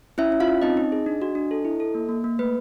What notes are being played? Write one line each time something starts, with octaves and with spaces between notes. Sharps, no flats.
C#4 E4 E5
C#4
F4 F5
C#4
C4 D#4 D#5
D#4
G#4
D4
F#4
D4
A4
E4
A4
A#3
A#3
A#3
A3 B4